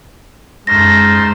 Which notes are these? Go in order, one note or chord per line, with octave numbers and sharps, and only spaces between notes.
F#2 G#3 A3 D#4 C5 F6 A6 A#6